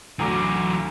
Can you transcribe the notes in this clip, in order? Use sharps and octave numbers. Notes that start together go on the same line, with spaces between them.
D2 E3 F#3 A#5 D6